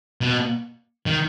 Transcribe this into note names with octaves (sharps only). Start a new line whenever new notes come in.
B2
D#3